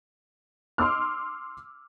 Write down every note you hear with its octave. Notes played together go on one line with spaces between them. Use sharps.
C6 D6 E6 F6